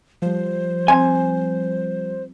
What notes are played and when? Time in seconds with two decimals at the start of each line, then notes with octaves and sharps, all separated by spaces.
0.22 F3 G3 C5
0.88 C4 G#5 C6